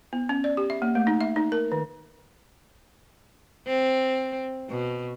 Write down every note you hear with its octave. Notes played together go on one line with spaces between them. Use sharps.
B3
C#4
D5
G4
E5
A#3
A3
D#4
E5
D#4
A#4
D#3
C4
B2